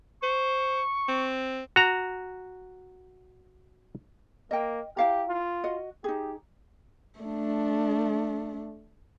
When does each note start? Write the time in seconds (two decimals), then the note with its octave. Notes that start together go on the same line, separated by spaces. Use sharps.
0.23 C5 C#6
1.08 C4
1.76 F#4 A#5
4.51 A#3 D#5 G5
4.97 E4 G4 F5 A#5
5.28 F4
5.64 F#4 D#5
6.04 D#4 G4 G#4
7.19 A3 D4